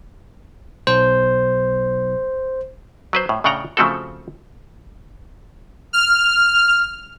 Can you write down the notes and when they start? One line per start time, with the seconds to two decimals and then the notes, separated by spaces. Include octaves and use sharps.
0.87 B1 C5
3.13 F#3 B4 C5
3.29 A2
3.44 A2 C#3 D4 F#5 G5 A#5
3.77 C#3 F3 A3 C4 F#4 A4
5.93 F6